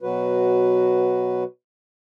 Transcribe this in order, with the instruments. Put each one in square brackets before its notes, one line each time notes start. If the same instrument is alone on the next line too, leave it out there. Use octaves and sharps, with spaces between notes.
[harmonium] B2 F#3 F#4 B4